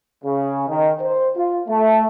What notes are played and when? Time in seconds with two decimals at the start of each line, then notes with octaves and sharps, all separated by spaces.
0.24 C#3
0.69 D#3
1.00 C5
1.37 F4
1.68 A3